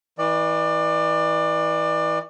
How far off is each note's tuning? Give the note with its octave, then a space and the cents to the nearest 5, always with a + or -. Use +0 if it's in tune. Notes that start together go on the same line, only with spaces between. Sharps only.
E3 -25 D5 +25